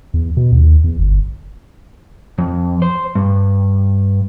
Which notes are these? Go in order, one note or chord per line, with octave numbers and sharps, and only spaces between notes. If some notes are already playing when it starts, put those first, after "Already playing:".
E2
B2
D#2
E2
G1
F2
C5
G2